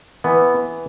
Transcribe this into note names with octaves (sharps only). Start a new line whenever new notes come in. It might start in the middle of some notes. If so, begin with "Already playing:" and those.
E3 B3